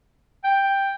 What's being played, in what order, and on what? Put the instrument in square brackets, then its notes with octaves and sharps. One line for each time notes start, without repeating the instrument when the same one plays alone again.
[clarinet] G5